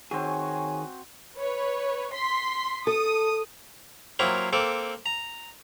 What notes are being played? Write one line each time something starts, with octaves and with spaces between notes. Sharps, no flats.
D#3 C4 F#4 G#4 C#5 G#5
B4 C#5
C6 B6
A4 D#6
F#3 A#3 C4 E4 F4
A#3 C4 A4 D6
A#5